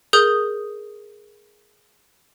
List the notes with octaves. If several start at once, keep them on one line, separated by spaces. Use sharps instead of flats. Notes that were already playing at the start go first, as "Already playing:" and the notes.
G#4 A#4 D#6 G6